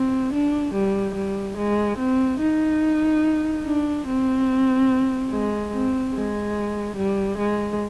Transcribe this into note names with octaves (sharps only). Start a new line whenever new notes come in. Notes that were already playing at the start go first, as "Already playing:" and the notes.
Already playing: C4
D4
G3
G3
G#3
C4
D#4
D4
C4
G#3
C4
G#3
G3
G#3